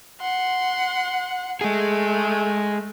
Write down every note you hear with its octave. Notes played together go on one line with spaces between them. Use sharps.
F#5 C6
G#3 A3 G#4